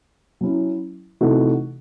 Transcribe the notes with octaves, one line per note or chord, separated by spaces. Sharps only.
F#3 C#4 E4
C3 E3 A3 D#4 F#4